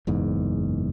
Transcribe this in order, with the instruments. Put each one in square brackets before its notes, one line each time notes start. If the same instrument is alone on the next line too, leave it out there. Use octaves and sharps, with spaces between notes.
[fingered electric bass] F#1 E2 G#2